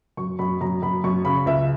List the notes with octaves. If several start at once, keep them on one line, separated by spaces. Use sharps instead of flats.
F#2 C#6
F#2 B5
F#2 A#5
F#2 B5
F#2 C#6
C#3 B5
C#2 E5